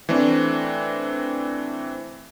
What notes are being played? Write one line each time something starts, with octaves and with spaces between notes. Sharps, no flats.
E3 A3 C4 D4